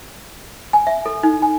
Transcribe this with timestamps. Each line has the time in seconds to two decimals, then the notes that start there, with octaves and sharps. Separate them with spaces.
0.73 G#5
0.87 E5
1.06 A4
1.23 D#4
1.42 G#5